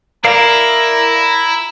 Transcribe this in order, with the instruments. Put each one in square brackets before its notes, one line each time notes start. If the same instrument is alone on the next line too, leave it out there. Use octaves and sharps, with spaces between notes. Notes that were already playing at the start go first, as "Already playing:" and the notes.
[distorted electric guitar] E4 [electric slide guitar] A#4 D5 F5 [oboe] A#5